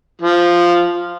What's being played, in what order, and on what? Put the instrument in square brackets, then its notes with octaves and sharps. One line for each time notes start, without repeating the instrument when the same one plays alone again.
[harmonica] F3